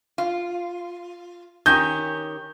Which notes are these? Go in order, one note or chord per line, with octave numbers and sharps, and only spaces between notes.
F4
D#3 C#4 G4 G6